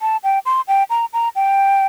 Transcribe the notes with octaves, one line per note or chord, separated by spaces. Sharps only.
A5
G5
C6
G5
A#5
A#5
G5